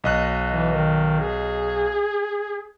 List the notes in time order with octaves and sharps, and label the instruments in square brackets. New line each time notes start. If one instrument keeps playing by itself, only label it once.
[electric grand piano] B1 D#5 F#6
[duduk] E3
D#3
G#4